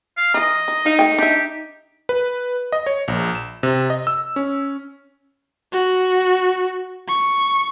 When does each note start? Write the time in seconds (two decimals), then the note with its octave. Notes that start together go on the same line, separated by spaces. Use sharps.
0.17 F5
0.34 E3 D#4 D#5
0.68 D#4
0.86 D#4 F5
0.99 A3 G5
1.18 D4 G4 E5
2.09 B4
2.72 D#5
2.86 C#5
3.08 A#1
3.35 E7
3.63 C3
3.90 D#5
4.07 E6
4.36 C#4
5.72 F#4
7.08 C#6